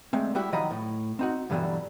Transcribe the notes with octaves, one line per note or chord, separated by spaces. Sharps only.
D3 G#3 A3 C4
G3 E4 F#4 G4
D#3 F3 F#3 D#5 A#5 B5
A2
C4 D#4 F#4
G2 B2 D3 E3 F#3 G3